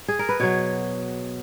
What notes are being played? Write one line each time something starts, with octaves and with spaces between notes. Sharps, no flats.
G#4
A#4
B4
B2 F#3 C#5